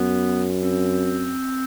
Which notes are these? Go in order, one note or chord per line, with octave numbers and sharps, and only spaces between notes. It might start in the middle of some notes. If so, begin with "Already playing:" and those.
Already playing: F#2 B3
C4